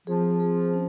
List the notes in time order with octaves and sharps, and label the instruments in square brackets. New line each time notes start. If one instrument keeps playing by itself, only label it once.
[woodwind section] F3 [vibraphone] C4 F4 G#4
[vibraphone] C4 F4 G#4
C#4